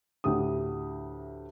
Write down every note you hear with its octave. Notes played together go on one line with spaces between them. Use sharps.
D2 A2 G4 D#6